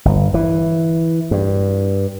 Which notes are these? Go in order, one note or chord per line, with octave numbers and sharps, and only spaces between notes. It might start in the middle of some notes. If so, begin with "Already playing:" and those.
G1
E3
G2